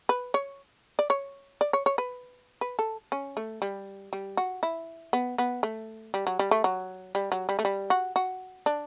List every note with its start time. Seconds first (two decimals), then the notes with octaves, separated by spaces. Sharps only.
0.09 B4
0.34 C#5
0.99 D5
1.10 C#5
1.61 D5
1.73 C#5
1.86 C#5
1.98 B4
2.61 B4
2.79 A4
3.12 C#4
3.37 A3
3.62 G3
4.13 G3
4.37 F#4
4.63 E4
5.13 B3
5.38 B3
5.63 A3
6.14 G3
6.27 F#3
6.39 G3
6.51 A3
6.64 F#3
7.15 G3
7.32 F#3
7.49 G3
7.59 A3
7.65 G3
7.90 F#4
8.16 F#4
8.66 D4